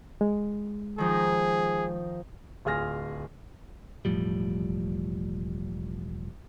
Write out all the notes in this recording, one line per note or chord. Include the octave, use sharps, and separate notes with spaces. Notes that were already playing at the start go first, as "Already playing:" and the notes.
G#3
D#3 F3 D#4 G#4
D1 F4 G#4 F6 A#6
E1 A2 F3 G3